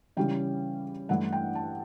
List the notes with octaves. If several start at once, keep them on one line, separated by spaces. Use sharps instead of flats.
C#3 E3 G3 C#4 G5
G2 E3 A3 E4 F#5
G5
A5